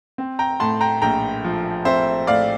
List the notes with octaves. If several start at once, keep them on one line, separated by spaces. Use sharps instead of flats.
C4
G5 A#5
A2 A5 C6
G5 A#5
A#1 G5 A#5
F3
C4 C5 E5
A2 D5 F5